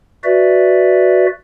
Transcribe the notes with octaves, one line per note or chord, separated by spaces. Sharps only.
F#4 B4 D5 E5